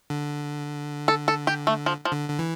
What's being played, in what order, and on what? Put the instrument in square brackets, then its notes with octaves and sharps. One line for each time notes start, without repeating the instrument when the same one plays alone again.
[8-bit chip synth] D3
[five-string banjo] A4
A4
G4
A3
F3
F3
[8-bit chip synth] D3
D3
E3